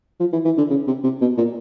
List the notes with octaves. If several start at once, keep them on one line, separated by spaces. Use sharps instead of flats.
F3
E3
E3
D3
C#3
C3
C3
B2
A#2